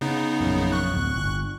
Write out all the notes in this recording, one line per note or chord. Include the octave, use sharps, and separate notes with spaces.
C#3 B3 D#4
A#1 F#2
C#6 F#6
D1
G1